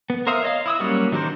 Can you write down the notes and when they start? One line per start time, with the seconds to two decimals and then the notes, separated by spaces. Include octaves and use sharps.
0.10 B3
0.27 A#4 C5 E5 F5 D#6
0.43 C#5 D#5 F5
0.66 E4 D#6 E6
0.80 F#3 G3 A#3 C#4 C#5
1.12 D#3 F#3 D4 A#4 C5